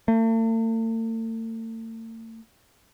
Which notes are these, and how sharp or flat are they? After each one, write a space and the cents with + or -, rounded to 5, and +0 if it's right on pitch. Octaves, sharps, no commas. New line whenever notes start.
A3 +45